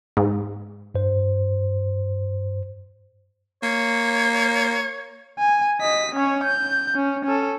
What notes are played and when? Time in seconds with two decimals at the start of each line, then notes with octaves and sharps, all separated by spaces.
0.17 G#2
0.95 G2 C5
3.63 A#3 C#5
5.39 G#5
5.81 D#5 B6
6.15 C#4 C#5
6.44 G6
6.95 C#4
7.25 C#4 A4